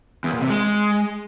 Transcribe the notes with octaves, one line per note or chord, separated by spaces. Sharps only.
E2
A#2
C3
G#3